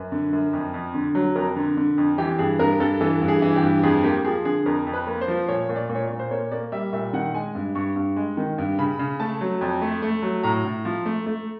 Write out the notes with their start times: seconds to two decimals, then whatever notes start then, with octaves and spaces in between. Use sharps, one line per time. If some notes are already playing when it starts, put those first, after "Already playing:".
Already playing: F#2 B4
0.12 D3
0.33 F#2
0.53 F2
0.74 F2
0.94 D3
1.15 F#3
1.36 F2 A#4
1.56 D3
1.77 D3
1.98 F2
2.18 E3 G4
2.39 G2 G#4
2.59 G2 A#4
2.80 G2 A4
3.01 E3 A4
3.22 G2
3.28 G#4
3.42 E3
3.56 G4
3.63 G2
3.83 F2 G#4
4.04 A#3 G4
4.24 F3 G#4
4.45 D3 G#4
4.66 F2 A#4
4.87 F2
4.93 B4
5.07 A#3
5.21 C5
5.28 F3
5.48 A#2 C#5
5.69 A#2
5.76 D5
5.89 A#2
5.95 C#5
6.04 D5
6.10 A#2
6.19 C5
6.31 A#3 C#5
6.51 A#3 D5
6.72 G3 E5
6.93 A#2 E5
7.13 D#3 F#5
7.34 G#3 G#5
7.55 G2
7.75 G2 C#6
7.96 G2
8.16 G#3
8.37 D#3
8.58 G2
8.78 C#3 B5
8.99 C#3
9.20 A3 A5
9.41 F#3
9.61 F2
9.82 A3
10.02 A3
10.23 F#3
10.43 A2 A#5
10.65 A2
10.85 F3
11.06 A3
11.26 A3